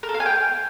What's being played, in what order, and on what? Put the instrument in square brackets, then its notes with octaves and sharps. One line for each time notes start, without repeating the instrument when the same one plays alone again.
[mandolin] A#4
A4
F5
G#5
G5